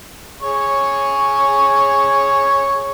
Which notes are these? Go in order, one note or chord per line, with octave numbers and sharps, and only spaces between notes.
G#4 C#5 C#6